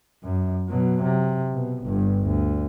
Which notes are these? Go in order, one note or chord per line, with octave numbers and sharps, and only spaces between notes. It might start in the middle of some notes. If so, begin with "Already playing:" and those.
F#2
B2 F#3
C3
B2
G1 G2
D2